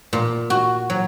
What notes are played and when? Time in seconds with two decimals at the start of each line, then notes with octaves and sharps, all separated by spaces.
0.13 A#2
0.50 F#4
0.90 F#3